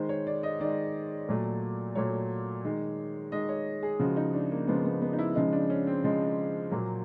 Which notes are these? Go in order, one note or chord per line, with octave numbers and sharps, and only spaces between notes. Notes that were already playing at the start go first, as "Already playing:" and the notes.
Already playing: D#3 G#3 C5
C#5
D5
D#5
D#3 G#3 D5
A#2 F#3 A3
A#2 F#3 A3 C#5
D#3 G#3
D#3 G#3 D#5
C#5
G#4
C#3 F3 G#3 F#4
D#4
D4
A#3
C#3 F3 G#3 B3
B3
B3
D#4
E4
C#3 F3 G#3 D#4
D4
C#4
C4
C#3 F3 G#3
A#2 F#3 A#3